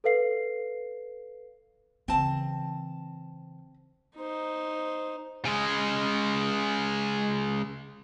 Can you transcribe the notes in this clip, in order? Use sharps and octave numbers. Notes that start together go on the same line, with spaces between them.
A4 B4 F5 C7
C#3 E3 C4 A5
D#4 C5
C#3 G#3